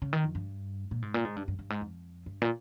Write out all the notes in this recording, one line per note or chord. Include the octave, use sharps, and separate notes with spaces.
C#3
D#3
F2
G2
A#2
G#2
A#2
G#2
G2
G2
G2
G#2
F2
G2
A#2